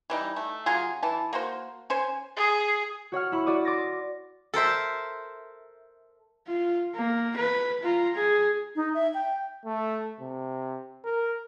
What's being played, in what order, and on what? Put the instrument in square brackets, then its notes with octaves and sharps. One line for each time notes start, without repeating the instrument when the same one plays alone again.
[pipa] E3 G3 D#4
A3
C#3 F#3 F4 G#4
E3 A5
A#3 F#4 C5
C#4 C5 G#5
[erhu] G#4
[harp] F#4 C#5 F#5 F6
E4 B5 C#6
F#4 D5 D6 D#6
C6 D6 A6 A#6
[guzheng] A4 A#4 C5 E5
[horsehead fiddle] F4
A#3
B4
F4 A#5
G#4
[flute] D#4
E5
G5
[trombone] A3
C3
A#4